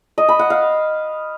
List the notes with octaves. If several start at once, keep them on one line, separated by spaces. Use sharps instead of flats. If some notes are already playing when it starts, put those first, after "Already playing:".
D#5
B5
F#5
F5